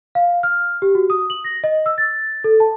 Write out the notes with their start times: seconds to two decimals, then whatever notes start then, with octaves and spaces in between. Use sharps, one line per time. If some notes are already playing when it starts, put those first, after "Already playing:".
0.15 F5
0.43 F6
0.82 G4
0.95 F#4
1.10 D#6
1.30 F#7
1.44 A#6
1.64 D#5
1.86 E6
1.98 A6
2.44 A4
2.60 A5